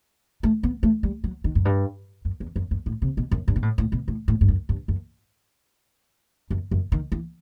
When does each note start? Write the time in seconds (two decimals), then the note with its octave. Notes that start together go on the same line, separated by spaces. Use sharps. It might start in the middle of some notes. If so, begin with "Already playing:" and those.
0.43 A3
0.63 B3
0.83 A3
1.03 G3
1.24 F#3
1.44 D#3
1.55 F#2
1.65 G2
2.25 F#2
2.40 E2
2.56 F#2
2.71 F#2
2.86 A2
3.02 C3
3.17 B2
3.32 F#2
3.48 G2
3.56 B2
3.63 A2
3.78 A2
3.92 B2
4.08 A2
4.28 A2
4.41 G2
4.48 F#2
4.69 G2
4.88 F#2
6.51 F#2
6.71 F#2
6.92 D#3
7.12 E3